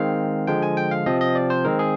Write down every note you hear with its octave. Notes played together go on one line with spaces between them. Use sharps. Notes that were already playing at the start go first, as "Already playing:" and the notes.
Already playing: D#3 G#3 C4 F5
D3 F3 G#3 G5
G#5
G5
F5
C3 F3 C4 D#5
D#5
D5
C5
D#3 G#3 C4 A#4
G#4